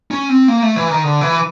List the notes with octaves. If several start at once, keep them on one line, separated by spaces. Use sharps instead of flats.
C#4
C4
A#3
A3
E3
D#3
D3
E3